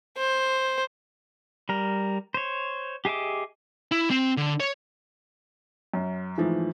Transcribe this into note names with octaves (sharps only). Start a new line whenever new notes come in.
C5
G3 A#4
C5 C#5
G4 G#4 D#5 E5 D6
E4
C4
D3
C#5
F#2
G#2 E3 F3 A3